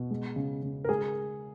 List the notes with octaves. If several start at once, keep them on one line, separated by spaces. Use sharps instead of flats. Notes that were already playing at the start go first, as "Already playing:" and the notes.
Already playing: B2
G#3
C#3
C#3
A#4
G#3 G#4